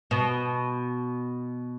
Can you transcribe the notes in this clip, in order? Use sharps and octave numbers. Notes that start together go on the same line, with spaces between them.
B2